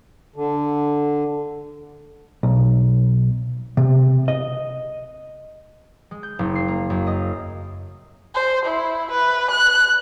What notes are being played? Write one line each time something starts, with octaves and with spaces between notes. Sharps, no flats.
D3
B1
C3
D#5
G#3
G6
F#1
C7
A#3
F#2
D#5
C5
E4
B4
F#6